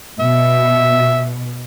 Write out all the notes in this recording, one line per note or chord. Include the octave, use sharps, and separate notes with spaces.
B2 E5